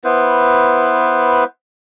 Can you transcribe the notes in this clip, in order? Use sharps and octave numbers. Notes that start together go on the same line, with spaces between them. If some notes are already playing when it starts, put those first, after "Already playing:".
B3 E4 B4 C5